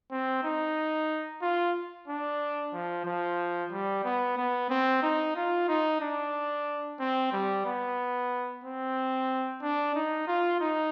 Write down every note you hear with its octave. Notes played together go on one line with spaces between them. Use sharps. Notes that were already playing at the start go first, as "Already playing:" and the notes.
C4
D#4
F4
D4
F3
F3
G3
B3
B3
C4
D#4
F4
D#4
D4
C4
G3
B3
C4
D4
D#4
F4
D#4